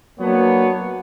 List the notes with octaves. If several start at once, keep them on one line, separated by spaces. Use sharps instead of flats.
F#3 A#3 B3 D4 C#5